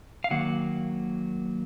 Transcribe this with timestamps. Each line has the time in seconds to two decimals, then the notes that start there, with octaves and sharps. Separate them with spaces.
0.24 F5
0.30 D#3 F#3 A#3 F#5